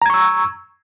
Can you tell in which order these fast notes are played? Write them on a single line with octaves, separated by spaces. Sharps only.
A#5 G#6 C#6 E6